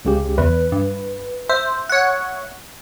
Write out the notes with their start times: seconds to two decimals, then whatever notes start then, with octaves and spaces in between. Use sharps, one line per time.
0.05 C#2 C#3 G4
0.38 E2 B4
0.72 G2
1.49 C5 E5
1.89 C#5 F#5